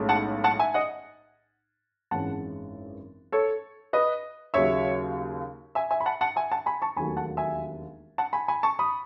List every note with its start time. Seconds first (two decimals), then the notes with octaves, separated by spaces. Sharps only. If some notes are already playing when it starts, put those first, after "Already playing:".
Already playing: B1 A2 G#3 C#4
0.09 F#5 A5
0.44 F#5 A5
0.59 E5 G#5
0.74 D#5 F#5
2.11 G#1 F#2 E3 G#3 C#4 F#5 A5
3.32 A4 C#5
3.93 B4 D#5
4.54 D#2 C#3 F#3 C#5 E5
5.75 E5 G#5
5.91 E5 G#5
6.01 B5
6.06 F#5 A5
6.21 F#5 A5
6.36 E5 G#5
6.52 F#5 A5
6.66 G#5 B5
6.82 A5 C#6
6.96 E1 D#2 D#3 F#3 A3 G#5 B5
7.17 F#5 A5
7.37 E5 G#5
8.18 F#5 A5
8.33 G#5 B5
8.48 G#5 B5
8.63 A5 C#6
8.79 B5 D#6